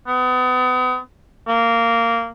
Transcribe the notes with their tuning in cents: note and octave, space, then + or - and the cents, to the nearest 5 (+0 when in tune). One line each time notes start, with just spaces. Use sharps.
B3 +35
A#3 -15